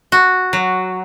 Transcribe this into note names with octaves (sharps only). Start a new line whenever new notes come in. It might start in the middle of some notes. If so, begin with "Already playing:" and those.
F#4
F#3